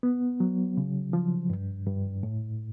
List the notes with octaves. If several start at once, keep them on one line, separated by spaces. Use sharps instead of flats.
B3
F#3
C#3
F3
G2
G2
A2